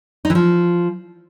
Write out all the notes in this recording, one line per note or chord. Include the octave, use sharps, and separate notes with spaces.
D#4
E3
F3